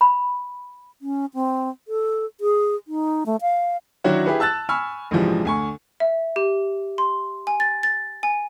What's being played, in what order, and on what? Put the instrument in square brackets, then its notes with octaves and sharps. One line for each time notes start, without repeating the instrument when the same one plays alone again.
[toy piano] B5
[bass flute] C#4
C4
A4
G#4
D#4
A3
F5
[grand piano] D#3 F#3 D4 E4 F#4 C#5
E4 G4 G#4 B4
A5 E6 F#6 A6
G#5 B5 C#6 E6 F6
A#1 G#2 C3 E3 F3 G#3
D2 G#5 C#6
[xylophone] E5
G4
C6
G#5
A6
A6
G#5